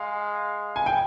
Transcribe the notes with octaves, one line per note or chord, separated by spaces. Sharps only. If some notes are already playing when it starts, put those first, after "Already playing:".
Already playing: G#3 F5
G#5
G5